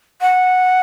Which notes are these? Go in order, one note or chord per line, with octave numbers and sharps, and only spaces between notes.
F#5